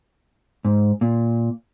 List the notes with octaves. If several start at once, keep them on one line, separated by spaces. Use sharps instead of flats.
G#2
A#2